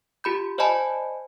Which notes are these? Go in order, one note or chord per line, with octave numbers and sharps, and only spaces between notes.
F4 G4 B5 G6
C5 D5 D#5 G#5 A5 B5